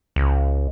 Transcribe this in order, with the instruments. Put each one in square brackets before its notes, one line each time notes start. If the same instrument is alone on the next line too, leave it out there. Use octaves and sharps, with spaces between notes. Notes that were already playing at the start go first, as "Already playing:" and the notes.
[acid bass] C#2